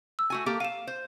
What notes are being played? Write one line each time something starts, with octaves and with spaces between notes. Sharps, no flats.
E6
A3 F#4 G#5
A#3 G4 A4
F5 D#7 E7
C5